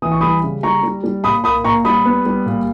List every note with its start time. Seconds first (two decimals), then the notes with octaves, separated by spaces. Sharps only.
0.02 E3 D#6
0.12 C#6
0.21 G3 B5 D#6
0.43 C#3
0.63 G3 A#5 C#6
0.83 G3
1.04 G3
1.24 A#2 B5 D#6
1.44 A#3 B5 D#6
1.64 A#2 A#5 C#6
1.85 G3 B5 D#6
2.05 B3
2.26 G3
2.46 A#2